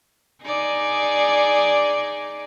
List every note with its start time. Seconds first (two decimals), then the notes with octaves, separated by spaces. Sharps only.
0.44 D#4 G#4 D5